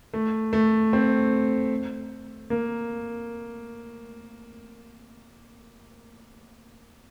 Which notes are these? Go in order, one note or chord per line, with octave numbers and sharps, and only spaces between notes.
A3
A3
C4
A#3